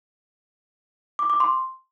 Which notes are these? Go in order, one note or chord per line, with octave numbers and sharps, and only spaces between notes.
D6
D6
C6